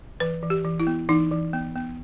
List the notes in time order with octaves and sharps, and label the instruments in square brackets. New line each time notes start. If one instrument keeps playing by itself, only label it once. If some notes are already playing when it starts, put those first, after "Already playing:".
[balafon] E3 B4
E3
G4
E3
E4
B3
E3 D#4
E3
B3
B3